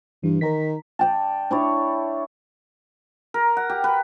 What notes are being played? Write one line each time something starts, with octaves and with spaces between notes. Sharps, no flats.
G2 E3
D#3 A#4 A#5 B6
D5 G5 A5
D4 E4 C#5
A#4
F#5
G4
B4